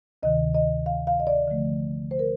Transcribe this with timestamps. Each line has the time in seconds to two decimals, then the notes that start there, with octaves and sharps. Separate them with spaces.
0.23 D2 C3 D#3 D#5
0.54 D#5
0.86 F5
1.07 F5
1.20 D#5
1.27 D5
1.48 D3 F3 A3
2.11 C5
2.19 A#4